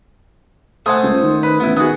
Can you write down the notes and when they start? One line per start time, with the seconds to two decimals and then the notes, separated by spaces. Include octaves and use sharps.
0.86 A3 C5 F#5 G#5 A5 C6 D#6
1.03 C#2
1.22 D#3
1.43 B4
1.60 A1 B3 E4 E5
1.77 D#3 B3 F#4 G#4 D#6